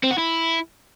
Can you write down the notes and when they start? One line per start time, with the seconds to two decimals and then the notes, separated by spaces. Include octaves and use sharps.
0.03 C4
0.11 F#4
0.18 E4